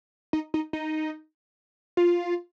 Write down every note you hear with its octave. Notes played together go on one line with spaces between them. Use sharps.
D#4
D#4
D#4
F4